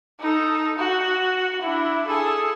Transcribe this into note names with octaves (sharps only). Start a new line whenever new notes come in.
D#4 A4
F#4
D4 E4
G#4 A4